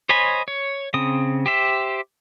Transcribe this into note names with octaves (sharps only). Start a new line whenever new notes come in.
C5 C#5 D#5 G#5 B5
C#5
C#3 C4 D#6
G4 C5 E5